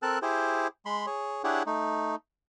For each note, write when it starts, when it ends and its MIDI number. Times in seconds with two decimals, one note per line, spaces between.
0.02 0.19 60
0.02 0.19 69
0.02 0.19 70
0.02 0.19 81
0.02 0.19 90
0.22 0.67 64
0.22 0.67 67
0.22 0.67 68
0.22 0.67 72
0.86 1.06 56
0.86 1.06 83
0.86 1.06 84
1.06 1.43 68
1.06 1.43 73
1.44 1.63 62
1.44 1.63 64
1.44 1.63 67
1.44 1.63 68
1.44 1.63 73
1.44 1.63 78
1.66 2.15 57
1.66 2.15 63